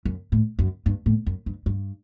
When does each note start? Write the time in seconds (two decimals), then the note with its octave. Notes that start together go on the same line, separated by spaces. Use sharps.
0.05 F#2
0.32 A2
0.59 F#2
0.86 G2
1.06 A2
1.26 F#2
1.46 G2
1.66 G2